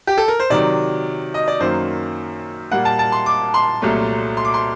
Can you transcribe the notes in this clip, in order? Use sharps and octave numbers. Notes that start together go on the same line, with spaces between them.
G4
A4
A#4
C5
C3 D#3 F#3 D5
D#5
D5
F#2 D#3 F#3 A#3 C5
A#2 G3 A#3 F#5
A5
A5
C6
D6
C6
C2 A#2 F#3 A3
C6
D6
C6